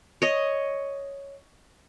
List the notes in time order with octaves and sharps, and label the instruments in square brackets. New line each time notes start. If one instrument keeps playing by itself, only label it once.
[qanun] C#5 D#5